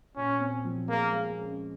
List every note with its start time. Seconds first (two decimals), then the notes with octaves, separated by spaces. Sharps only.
0.16 A#2 C#4
0.40 C4
0.65 F3
0.88 G#3 A#3
1.13 G#3
1.38 C#4